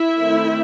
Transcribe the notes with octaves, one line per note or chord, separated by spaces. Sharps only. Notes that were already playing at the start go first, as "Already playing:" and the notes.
Already playing: E4 E5
D#3 A3 C4